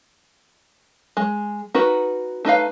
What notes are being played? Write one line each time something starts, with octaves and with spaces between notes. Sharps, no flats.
G#3
D#4 F#4 A#4 B4
A3 D#4 B4 F5